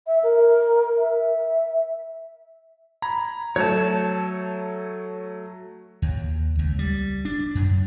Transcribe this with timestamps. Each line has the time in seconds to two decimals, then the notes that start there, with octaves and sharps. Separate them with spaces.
0.07 E5
0.23 A#4
0.97 E5
3.02 A#5 B5 G#6
3.56 F#3 A3 C#5 A5
6.02 D#2
6.59 C#2
6.79 G3
7.25 D4
7.55 F#2